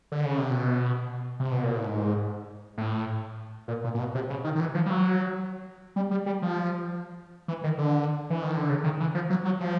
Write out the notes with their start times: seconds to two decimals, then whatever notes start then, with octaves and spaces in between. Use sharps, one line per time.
0.12 D3
0.25 C#3
0.38 C3
0.51 B2
1.40 C3
1.51 B2
1.64 A#2
1.75 A2
1.86 G#2
2.78 A2
3.68 A#2
3.84 A#2
3.94 A#2
3.99 B2
4.15 C3
4.30 C#3
4.44 D#3
4.55 D#3
4.60 E3
4.74 F3
4.86 G3
4.90 F#3
5.96 G3
6.11 G3
6.26 G3
6.42 F3
7.48 E3
7.64 D#3
7.78 D3
8.30 E3
8.43 D#3
8.56 D3
8.70 C#3
8.84 D#3
9.00 E3
9.15 F3
9.30 F#3
9.45 F#3
9.60 F3